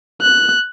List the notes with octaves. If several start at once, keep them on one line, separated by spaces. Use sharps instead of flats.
F#6